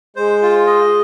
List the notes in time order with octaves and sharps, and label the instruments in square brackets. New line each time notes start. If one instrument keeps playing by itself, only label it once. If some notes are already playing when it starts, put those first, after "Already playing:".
[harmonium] G#3 [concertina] C5
[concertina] F4
D#5